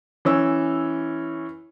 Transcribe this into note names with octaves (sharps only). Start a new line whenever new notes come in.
E3 C#4 E6